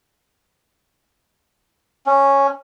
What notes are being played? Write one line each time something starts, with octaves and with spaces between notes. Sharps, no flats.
C#4